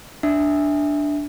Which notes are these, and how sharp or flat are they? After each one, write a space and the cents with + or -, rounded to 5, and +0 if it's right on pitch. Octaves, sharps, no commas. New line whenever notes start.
D4 +0 E5 -10